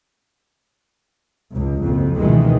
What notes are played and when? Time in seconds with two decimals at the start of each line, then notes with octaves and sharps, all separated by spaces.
1.51 C#2
1.82 F#1 F2
2.18 C#2 B2 D#3 E3 G#3